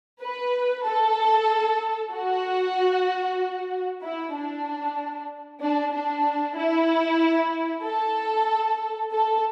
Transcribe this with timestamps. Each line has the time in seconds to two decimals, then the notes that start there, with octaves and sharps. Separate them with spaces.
0.22 B4
0.85 A4
2.12 F#4
4.03 E4
4.35 D4
5.62 D4
5.94 D4
6.57 E4
7.84 A4
9.12 A4